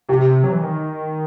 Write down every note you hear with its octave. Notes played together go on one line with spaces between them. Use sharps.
C3 G4
F#3
E3
D#3